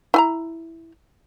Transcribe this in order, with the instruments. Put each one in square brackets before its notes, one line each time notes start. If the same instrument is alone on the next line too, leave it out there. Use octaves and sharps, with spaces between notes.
[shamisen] E4 G#5 A#5